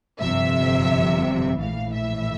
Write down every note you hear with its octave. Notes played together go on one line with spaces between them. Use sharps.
G1 F2 C3 E5
A#1 A2 E3 F5
E5